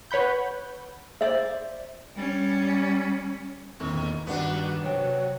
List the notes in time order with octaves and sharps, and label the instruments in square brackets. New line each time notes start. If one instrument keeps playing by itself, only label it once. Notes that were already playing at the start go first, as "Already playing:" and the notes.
[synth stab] B4 C#5 F#5 B5 G6
[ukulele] C5 D5 E5
[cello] G3 C#4
[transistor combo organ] E2 A#2 [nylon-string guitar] D3 C4 [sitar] D#3
[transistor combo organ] G2 F#4 [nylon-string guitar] D#3 F#5 [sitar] B3 D4
[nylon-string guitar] C3 G5 [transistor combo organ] F#3 [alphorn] C#5